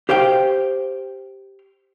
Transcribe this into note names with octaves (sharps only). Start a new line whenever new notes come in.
G4 C5 F5 G5